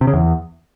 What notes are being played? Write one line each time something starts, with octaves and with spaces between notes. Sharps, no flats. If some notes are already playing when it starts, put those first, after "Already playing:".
C3
C#3
E2